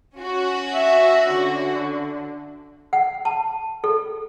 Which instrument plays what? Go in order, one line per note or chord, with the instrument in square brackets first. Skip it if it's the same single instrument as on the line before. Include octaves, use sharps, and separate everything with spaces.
[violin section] C#4 F#4
[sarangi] E5
D3
[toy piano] F#5
A5
A4